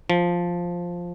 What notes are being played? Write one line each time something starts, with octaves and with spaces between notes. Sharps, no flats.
F3